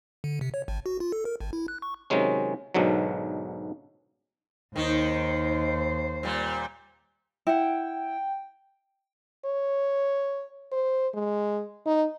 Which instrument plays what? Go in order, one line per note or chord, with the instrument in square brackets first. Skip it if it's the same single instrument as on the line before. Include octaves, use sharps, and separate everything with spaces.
[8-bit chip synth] D3
C3
C#5
G#1
F#4
F4
A4
A#4
G#1
E4
F#6
C#6
[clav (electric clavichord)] C3 D#3 F#3 G#3 C#4
B1 G#2 B2 D3 F#3
[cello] D#2 C5 [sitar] D#3 D#4
[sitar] A#2 G3
[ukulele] E4 F#5 [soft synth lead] G5
[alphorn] C#5
C5
G#3
D#4